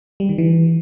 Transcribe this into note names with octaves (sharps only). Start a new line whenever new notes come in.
G3
D#3
E3